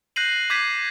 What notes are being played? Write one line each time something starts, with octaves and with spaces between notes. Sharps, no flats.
F#6 G6 A#6 C7 D#7 F#7
D6 G6 G#6 B6 C7 D#7